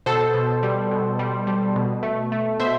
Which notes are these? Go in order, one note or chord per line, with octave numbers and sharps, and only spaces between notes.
B2 A4 C5
B2
G3
B2
G3
G3
B2
A3
A3
B2 C5 E5